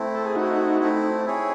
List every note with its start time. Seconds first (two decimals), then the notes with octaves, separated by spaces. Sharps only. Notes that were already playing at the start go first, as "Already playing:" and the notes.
Already playing: A3 C4 E4
0.15 A4
0.26 G#4
0.35 A3 C4 D#4 E4 F#4
0.80 A3 C4 E4
1.26 E4 G#4 C#5